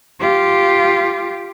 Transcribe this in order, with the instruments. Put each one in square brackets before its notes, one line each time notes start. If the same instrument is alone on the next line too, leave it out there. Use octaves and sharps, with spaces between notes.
[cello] F4 G4